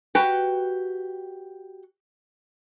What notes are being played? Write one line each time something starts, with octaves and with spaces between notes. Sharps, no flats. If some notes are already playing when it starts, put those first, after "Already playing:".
F#4 G4 B4 G5